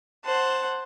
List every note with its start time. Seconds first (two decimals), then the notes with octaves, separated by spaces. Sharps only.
0.24 C5 F#5 A5